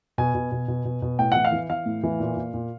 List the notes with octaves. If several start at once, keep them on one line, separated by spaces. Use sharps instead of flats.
B2 G#5
B2
B2
B2
B2
B2
A2 G5
E3 F#5
F5
E3
E3 F5
A2
E3
A#2
A#2
A#2